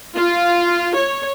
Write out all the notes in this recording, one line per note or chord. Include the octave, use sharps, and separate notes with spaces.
F4
C#5